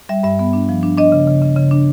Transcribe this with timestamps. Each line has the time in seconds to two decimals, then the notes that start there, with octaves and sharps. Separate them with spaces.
0.09 G3 E5
0.23 G2 E5
0.39 B3
0.53 D4
0.69 F3
0.83 D4
0.97 D4 D#5
1.12 C#3
1.27 C#3
1.42 C#3
1.56 C#3
1.71 D4